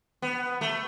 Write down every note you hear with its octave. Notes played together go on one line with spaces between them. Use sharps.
B3
A3